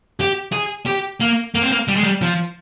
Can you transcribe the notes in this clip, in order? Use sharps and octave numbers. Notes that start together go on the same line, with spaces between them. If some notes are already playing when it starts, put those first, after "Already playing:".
G4
G#4
G4
A#3
A#3
C4
A#3
G3
G#3
G3
F3